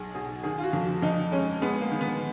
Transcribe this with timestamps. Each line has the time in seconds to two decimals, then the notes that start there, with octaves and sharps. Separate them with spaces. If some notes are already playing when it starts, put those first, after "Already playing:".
Already playing: B1 G#4
0.15 B2 G#4
0.44 D#3 G#4
0.58 F4
0.63 F#4
0.73 F2
1.02 F2 D#4
1.32 G#3 C#4
1.62 G#3 B3
1.81 A#3
1.91 D#3
2.01 B3